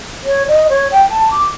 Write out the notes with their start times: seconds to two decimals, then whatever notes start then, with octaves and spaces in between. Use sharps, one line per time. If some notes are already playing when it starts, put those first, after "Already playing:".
0.25 C#5
0.48 D#5
0.70 C#5
0.92 G5
1.10 A5
1.31 D6